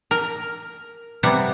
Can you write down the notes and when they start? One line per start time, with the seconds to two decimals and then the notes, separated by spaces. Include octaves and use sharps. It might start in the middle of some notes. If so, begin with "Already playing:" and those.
0.11 A#4
1.23 C3 G3 B3 F#5